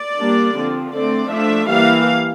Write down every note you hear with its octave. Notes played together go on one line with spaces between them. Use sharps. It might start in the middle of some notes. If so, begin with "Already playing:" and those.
Already playing: D5
G3 A#3 D4
D3 F3 C4
D3 A3 C4 D5
F3 A3 D4 E5
E3 G3 A#3 F5